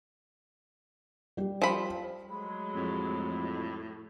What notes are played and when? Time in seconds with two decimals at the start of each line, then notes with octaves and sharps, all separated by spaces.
1.37 G3 G4
1.62 F3 B5
2.29 F#3 G#3 A3 B5
2.75 F2 A2